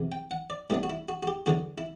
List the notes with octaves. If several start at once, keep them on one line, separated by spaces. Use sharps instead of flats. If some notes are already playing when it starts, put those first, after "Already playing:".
Already playing: E2 C3 F#3
G5
F#5
D5
A2 G3 B3 D4 E4
F#4
E4
F#4
F#4
G4
E2 D3 F#3 F#4
E4